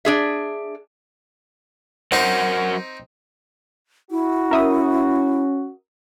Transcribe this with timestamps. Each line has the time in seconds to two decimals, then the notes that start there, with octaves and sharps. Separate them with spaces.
0.05 D4 G#4 E5
2.12 F#3 C4 D#4 A#4 F#5
4.11 E4 F#4
4.51 C#4 A#4 E5 D#6